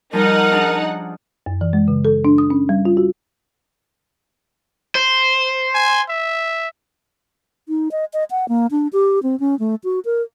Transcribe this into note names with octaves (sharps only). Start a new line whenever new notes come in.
F3 G3 D#4 A#4 D#5 F#5
C#4 D4 G#4
F#2
E3
G#3
C#3
A4
D4
D#6
C#4
G3
F4
F#4
C5
G#5
E5
D#4
D#5
D#5
F#5
A#3
D4
G4
C4
C#4
A3
F#4
A#4